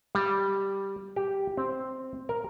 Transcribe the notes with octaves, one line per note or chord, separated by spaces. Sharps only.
G3
G4
C4
A#4